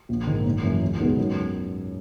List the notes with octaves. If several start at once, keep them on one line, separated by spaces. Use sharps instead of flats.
A#1
G#2 D#3 A#3
F#1
F#2 E3
C#2
B2 G#3 B3 D#4
F#2